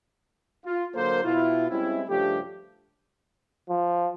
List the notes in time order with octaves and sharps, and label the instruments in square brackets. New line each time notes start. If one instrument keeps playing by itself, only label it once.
[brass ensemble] F4
D3 F#3 A#3 A4 A#4 C5
B2 E4 F4
G3 G#3 C4 C#4 E4
G2 C#3 F3 A3 D4 G4
[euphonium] F3